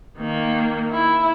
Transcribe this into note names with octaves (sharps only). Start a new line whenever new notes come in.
D#3 A#3
E4